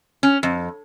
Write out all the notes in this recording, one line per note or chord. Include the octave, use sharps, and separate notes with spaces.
C#4
F2